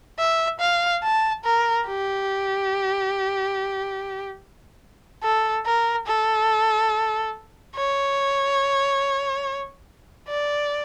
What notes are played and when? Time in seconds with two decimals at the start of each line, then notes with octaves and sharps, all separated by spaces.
0.19 E5
0.60 F5
1.03 A5
1.45 A#4
1.87 G4
5.23 A4
5.66 A#4
6.07 A4
7.76 C#5
10.28 D5